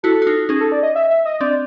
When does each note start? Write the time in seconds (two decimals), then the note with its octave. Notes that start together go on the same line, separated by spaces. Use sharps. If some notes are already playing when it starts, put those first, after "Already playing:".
0.03 E4 F#4 A4
0.22 F#4
0.27 D#4 F4
0.49 C#4 D#4 G#4
0.61 A4
0.72 D5
0.83 D#5
0.95 E5
1.10 E5
1.25 D#5
1.40 C4 D4 D5